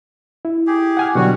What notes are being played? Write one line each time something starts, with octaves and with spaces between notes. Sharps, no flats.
E4
G4 G#4
F#5 G#5 F6
B2 D3 F#3 G3 F#4 F#5